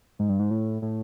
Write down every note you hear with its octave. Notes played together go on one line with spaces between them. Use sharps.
G#2
G2
G#2
A2
A2